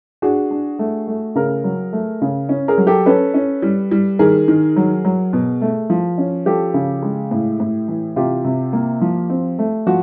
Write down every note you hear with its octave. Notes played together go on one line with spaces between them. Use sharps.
D4 F#4 G#4
D4
A3
A3
C#3 G#4 A#4
F#3
A3
C#3
C#4
G#4 A#4
F#3
G4 A4
C#4 A4 B4
C#4
G3
G3
D#3 G#4 A#4
D#3
F#3
F#3
B2
A3
F3
C#4
F3 G4 A4
C#3
G#3
A2
A2
E3
C3 F4 G4
C3
A#3
F3
C4
A3
F3 F#4